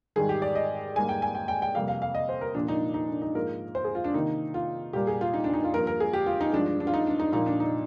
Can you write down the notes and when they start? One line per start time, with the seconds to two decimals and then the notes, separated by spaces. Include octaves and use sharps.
0.16 G#2 D#3 G3 G#4
0.29 G4
0.42 D5
0.55 D#5
0.96 G#2 G3 A#3 G#5
1.09 G5
1.22 G#5
1.35 G5
1.48 G5
1.62 G5
1.75 F2 C3 G3 A#3 F5
1.88 F5
2.02 F5
2.15 D#5
2.29 C5
2.41 A#4
2.54 A#2 F3 A#3 D4
2.68 D#4
2.94 D#4
3.07 D4
3.22 D#4
3.35 G#2 F3 A#3 A#4
3.75 C5
3.84 G#4
3.95 F4
4.04 D4
4.14 C3 D#3 A#3 D#4
4.54 F4
4.93 A#2 G3 A#3 G4
5.07 G#4
5.21 F4
5.34 D#4
5.44 D4
5.54 D#4
5.64 F4
5.74 G2 F3 A#3 A#4
5.87 A#4
6.00 G#4
6.13 G4
6.26 F4
6.41 D#4
6.53 G2 F3 G#3 D4
6.66 D4
6.80 D4
6.87 F4
6.94 D#4
7.07 D4
7.20 D#4
7.33 A#2 F3 A#3 D#4
7.46 D4
7.60 D#4